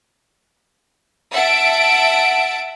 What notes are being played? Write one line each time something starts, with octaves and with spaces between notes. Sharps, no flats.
E5 F#5 A5 D7